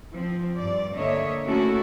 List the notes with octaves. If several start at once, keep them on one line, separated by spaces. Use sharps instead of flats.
F3 C4
G2 D5
D3 A#3 C#5 D#5 E5
A3 A#3 C#4 E4 F#4 A4